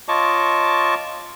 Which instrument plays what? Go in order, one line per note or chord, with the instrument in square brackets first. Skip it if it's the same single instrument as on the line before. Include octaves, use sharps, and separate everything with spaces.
[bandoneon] F4 C#5 D#5 A5 C#6 D6